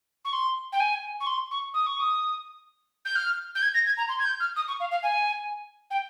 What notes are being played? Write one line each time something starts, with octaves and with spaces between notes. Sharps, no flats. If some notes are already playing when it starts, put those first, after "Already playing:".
C#6
C6
G5
G#5
C#6
C6
C#6
D#6
C#6
D#6
G6
F6
G6
G#6
A#6
G#6
A#5
C6
G#6
G6
F6
D#6
C#6
F5
F5
G#5
G5